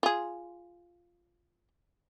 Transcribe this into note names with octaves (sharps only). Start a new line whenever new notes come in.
F4 G#4